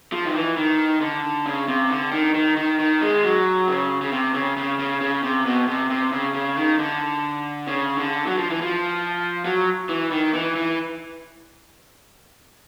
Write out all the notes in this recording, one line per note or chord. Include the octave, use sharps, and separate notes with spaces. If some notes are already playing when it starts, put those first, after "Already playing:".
F3
D#3
E3
D#3
D3
C#3
C3
D3
D#3
D#3
D#3
D#3
G#3
F#3
C#3
C#3
C3
C#3
C#3
C#3
C#3
C3
B2
C3
C3
C#3
C#3
D#3
D3
C#3
D3
F#3
F3
E3
F3
F#3
E3
D#3
E3
E3